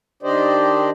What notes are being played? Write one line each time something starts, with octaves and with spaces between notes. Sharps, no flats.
D#3 D4 G4 C5 D5 D#5